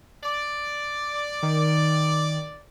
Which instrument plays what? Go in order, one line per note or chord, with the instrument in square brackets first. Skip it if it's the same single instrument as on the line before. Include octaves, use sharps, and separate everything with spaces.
[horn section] D5
[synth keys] D#3